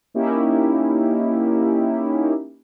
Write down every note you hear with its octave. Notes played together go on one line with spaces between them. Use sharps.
A#3 C#4 D#4 E4 G4